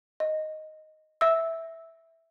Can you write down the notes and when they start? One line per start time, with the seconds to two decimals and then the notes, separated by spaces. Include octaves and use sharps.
0.20 D#5
1.21 E5 E6